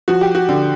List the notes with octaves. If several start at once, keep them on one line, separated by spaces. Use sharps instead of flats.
F3 F#4
G4
F#4
D3